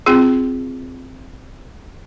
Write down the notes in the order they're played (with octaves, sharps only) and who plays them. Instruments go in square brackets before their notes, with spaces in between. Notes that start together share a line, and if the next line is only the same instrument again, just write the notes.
[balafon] C4 F4 G#4